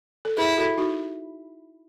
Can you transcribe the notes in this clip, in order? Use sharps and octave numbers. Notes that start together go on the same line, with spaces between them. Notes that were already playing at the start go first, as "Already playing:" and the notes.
A4
E4 G#4 B4
F#4 A4
D#4 F#4